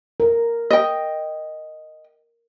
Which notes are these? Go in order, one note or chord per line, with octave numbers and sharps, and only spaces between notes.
A#4
D#5 G5